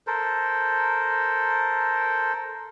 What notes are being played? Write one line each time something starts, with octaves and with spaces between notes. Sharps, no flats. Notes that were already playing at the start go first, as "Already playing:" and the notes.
A4 A#4 C5